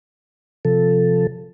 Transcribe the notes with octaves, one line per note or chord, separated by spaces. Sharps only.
C3 F3 A4